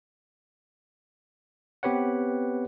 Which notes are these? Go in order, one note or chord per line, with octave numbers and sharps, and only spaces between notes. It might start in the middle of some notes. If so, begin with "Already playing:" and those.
B3 C4 G4 B4 C#5 F#5